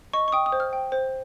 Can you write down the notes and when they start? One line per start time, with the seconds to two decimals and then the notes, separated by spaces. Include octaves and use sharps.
0.13 D#5 C#6
0.28 C#6
0.32 G5 D#6
0.46 D#6
0.52 C5
0.60 F6
0.73 G5
0.92 C5